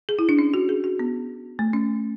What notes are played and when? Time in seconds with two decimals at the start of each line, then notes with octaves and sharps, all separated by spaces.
0.09 G#4
0.19 E4
0.29 D4
0.39 C#4
0.54 F#4
0.69 G#4
0.84 F#4
0.99 B3
1.59 A3
1.73 C#4